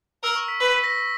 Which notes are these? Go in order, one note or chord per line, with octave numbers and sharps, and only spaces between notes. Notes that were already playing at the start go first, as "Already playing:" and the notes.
A#4 E6
C#6
B6
B4
B6
A#6